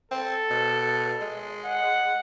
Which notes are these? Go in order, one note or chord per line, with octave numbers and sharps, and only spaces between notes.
C4 A4
B2
G#3
F#5